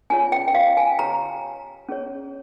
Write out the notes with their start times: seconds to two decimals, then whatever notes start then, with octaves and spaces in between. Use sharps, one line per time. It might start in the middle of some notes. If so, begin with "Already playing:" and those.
0.10 C#4 F4 G#4 C#5 G#5
0.32 G5
0.48 G5
0.55 F5
0.77 G#5
0.99 G4 C#5 A#5
1.89 C#4 G#4 C#5